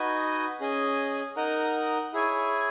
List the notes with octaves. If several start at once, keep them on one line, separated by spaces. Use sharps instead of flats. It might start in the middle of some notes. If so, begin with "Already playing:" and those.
Already playing: D#4 F#4 B4 D#5 G#5
C#4 G#4 D#5 G#5
D#4 A#4 D#5 F#5
E4 G#4 C#5 G#5